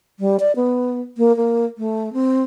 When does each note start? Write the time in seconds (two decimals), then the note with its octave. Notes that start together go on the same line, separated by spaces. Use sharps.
0.20 G3
0.40 D5
0.56 B3
1.17 A#3
1.37 A#3
1.78 A3
2.13 C4